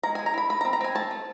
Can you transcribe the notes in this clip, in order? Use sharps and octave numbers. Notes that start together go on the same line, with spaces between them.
G#3 A#5
G#3 G#5
A#5
E4 B5
A3 B5
A#5
C4
A#5
C4 G#5
A3 A5
A3